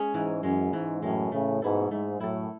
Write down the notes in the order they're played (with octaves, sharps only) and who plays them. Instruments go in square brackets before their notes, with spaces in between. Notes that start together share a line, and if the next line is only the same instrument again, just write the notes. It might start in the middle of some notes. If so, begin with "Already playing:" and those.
Already playing: [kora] G#3 C#4 G#4 C#5
[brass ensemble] G#2 [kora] E3
[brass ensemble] F#2 [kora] G#3 C#4
[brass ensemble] G#2 [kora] E3
[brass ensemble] F#2 A2 [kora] G#3 C#4
[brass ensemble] A2 C#3 [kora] A3
[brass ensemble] G#2 B2 [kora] E4 A4
[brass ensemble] G#2 [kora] A3
[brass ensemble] F#2 A2 [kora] E4 A4